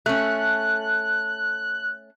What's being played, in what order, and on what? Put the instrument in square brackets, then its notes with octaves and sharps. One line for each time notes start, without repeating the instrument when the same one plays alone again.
[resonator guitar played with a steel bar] A3 C#4 [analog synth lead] F#6